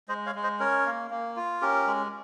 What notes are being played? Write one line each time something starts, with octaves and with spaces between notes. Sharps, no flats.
G#3 C5 D#5
C#5 F5
G#3
C5 D#5
C#4 A#4 C#5
A#3
A#3
F4
C#4 G4 A#4
G#3